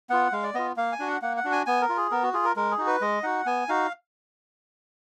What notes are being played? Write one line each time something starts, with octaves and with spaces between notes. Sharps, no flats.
B3 F4 F#5
G#3 F5
D5
B3 F4 D#5
A#3 F5
G#5
D4 F#4
F#5
A#3 F#5
F#5
D4 F#4
G#5
B3 G#5
A#4
F4
G#4
B3 A#4
F#4
F4 G#4
A#4
G#3 A#4
G#4
D#4 F#4
B4
G#3 D#5
D#4 F#4 F#5
B3 G#5
D#4 F#4 F5